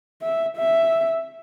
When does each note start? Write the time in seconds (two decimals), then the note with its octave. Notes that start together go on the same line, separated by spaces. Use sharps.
0.22 E5
0.57 E5